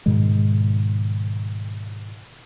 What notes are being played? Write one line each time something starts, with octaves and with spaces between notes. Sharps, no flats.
G#2 B2 D#3 G#3